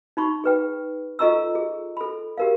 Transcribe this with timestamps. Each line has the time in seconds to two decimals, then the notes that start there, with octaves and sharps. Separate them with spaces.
0.17 D#4 B5 C#6
0.44 G#4 B4 G5
1.19 F4 A4 D#5 A#5 C#6 E6
1.55 G#4
1.97 A4 B5
2.38 G4 A#4 F5